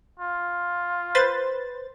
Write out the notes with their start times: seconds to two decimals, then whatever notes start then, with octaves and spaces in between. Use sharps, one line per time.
0.20 F4
1.15 B4 C5 A6